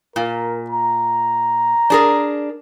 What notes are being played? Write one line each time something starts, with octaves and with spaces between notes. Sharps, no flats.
A#2 A#4
A#5
D4 G#4 A#4